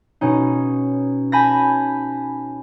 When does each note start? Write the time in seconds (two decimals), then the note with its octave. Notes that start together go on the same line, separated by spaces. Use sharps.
0.21 B2 C#4 D#4
1.32 G#5 A5 B5 G6 A6 A#6